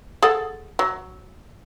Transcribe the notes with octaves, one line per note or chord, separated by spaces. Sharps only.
G#4 A4 F#5
F#3